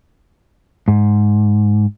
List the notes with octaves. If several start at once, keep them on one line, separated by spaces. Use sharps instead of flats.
G#2